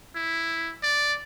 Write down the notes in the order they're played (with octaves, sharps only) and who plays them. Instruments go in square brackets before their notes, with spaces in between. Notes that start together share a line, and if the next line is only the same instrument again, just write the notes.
[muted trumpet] E4
D5